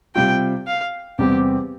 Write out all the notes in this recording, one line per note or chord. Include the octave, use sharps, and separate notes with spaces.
C3 G3 C4 F4 G5
F5
E2 C3 G3 C4 G4